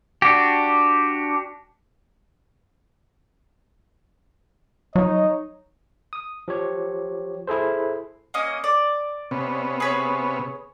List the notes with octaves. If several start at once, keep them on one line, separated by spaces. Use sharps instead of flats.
D4 F#4 G4
F#3 D#4 C#5 D#5
D#6
F3 G4 C#5
E4 G#4 A4 C5
A#3 C#4 D#5
D5
C3 B3 C#4
G#4 B4 C#5